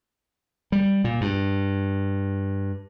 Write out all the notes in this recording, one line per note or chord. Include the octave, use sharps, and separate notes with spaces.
G3
A#2
G2